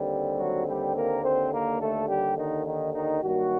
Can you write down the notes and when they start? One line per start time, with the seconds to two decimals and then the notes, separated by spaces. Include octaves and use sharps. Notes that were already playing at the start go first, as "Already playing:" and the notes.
Already playing: D#2 D3 G3 C4
0.38 F#3 F#4
0.66 G3 G4
0.95 A#3 A#4
1.24 C4 C5
1.52 A#3 A#4
1.80 A3 A4
2.08 G3 G4
2.38 D#3 D#4
2.66 D#3 D#4
2.94 D#3 D#4
3.23 G2 D#3 F#3 G3 A#3 F#4